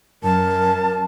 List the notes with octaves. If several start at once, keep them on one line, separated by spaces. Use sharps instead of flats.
F#2 A#4 A5